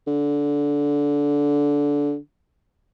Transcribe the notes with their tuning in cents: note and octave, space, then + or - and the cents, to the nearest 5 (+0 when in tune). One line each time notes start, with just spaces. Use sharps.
D3 -15